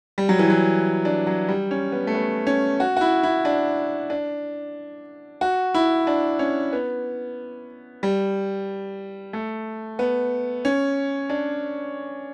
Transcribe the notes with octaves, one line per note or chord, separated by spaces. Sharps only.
G3
F#3
E3
F#3
D4
F#3
G3
C#4
B3
A3
B3
C#4
F#4
F#4
E4
E4
D4
D4
F#4
E4
D4
C#4
B3
G3
A3
B3
C#4
D4